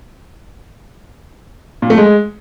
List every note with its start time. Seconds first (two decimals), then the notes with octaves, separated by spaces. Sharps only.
1.82 A#2
1.90 A3
1.98 G#3